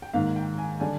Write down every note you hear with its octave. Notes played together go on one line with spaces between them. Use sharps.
G5
G#2 D#3 A#3 F5
G5
G#5
D3 G3 G#5